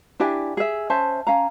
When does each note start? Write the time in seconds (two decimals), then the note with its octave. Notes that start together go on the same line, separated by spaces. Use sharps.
0.20 D4 E4 G4 G#5
0.57 G#4 E5
0.90 C#4 C5 E5 A5
1.27 C#4 F5 A#5